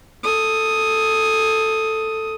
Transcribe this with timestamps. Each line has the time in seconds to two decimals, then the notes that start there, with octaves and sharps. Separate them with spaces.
0.23 A4 D#6